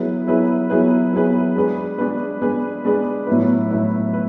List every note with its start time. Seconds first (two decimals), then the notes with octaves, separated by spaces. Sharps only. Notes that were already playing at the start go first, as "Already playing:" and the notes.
Already playing: F#3 B3 E4 G#4 B4
0.27 F#3 B3 E4 G#4 B4
0.70 F#3 B3 E4 G#4 B4
1.13 F#3 B3 E4 G#4 B4
1.56 G#3 D4 G#4 B4
1.98 G#3 D4 G#4 B4
2.42 G#3 D4 G#4 B4
2.85 G#3 D4 G#4 B4
3.27 A2 F#3 B3 E4 B4
3.70 A2 F#3 B3 E4 B4
4.13 B4